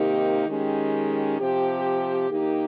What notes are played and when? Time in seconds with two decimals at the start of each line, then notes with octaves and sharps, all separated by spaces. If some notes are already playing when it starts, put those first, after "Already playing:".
Already playing: C3 D#3 A#3 D#4 G4
0.46 D#3 G#3 C#4 G4
1.39 C3 F3 C4 G4
2.30 D#3 A#3 D#4 G4